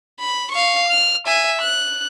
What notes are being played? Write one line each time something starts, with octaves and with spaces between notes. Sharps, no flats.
B5
F5 C#6
F6
E5 G#5
F#6